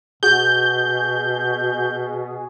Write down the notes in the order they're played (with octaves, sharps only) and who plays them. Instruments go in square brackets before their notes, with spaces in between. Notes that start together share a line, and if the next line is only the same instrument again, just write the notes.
[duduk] B2 [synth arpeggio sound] F#4 G#4 [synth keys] G6